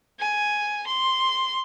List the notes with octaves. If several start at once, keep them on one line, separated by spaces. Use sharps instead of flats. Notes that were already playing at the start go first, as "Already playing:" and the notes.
G#5
C6